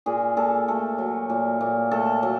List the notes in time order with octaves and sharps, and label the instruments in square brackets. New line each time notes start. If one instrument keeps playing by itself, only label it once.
[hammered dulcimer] A#2 G#4
A#2 A4
A3 A4
F#3
A#2
A#2
A3 A4
F#3